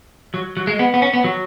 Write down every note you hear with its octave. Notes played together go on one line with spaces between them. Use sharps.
F#3
F#3
G#3
B3
B3
C#4
B3
F#3